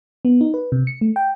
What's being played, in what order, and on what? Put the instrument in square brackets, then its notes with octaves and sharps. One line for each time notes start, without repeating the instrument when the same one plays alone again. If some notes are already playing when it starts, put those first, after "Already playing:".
[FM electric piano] B3
D#4
B4
C3
C#7
A3
G5